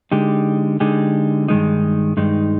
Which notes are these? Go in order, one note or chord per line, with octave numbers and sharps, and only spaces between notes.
D3 G#3 D#4 G4
D3 G#3 D#4 G4
G2 D#3 G#3 D#4
G2 D#3 G#3 D#4